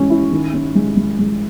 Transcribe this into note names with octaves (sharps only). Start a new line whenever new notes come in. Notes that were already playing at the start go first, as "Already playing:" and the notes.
Already playing: E3 G#3 C#4
E4
D#3
C#4
G#3
G#3
G#3